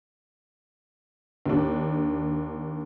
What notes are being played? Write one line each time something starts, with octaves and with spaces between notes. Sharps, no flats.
D#2 D4